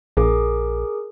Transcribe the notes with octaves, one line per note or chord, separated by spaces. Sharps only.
A#1 G#4 A#4 D6